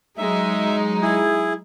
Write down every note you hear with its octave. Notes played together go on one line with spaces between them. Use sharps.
F#3 G#3 D#4 E5
E4 G#4